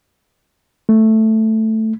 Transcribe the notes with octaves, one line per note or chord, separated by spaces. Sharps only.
A3